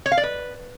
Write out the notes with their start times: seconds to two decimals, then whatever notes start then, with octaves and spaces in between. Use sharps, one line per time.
0.06 C#5
0.12 F5
0.18 D5
0.23 B4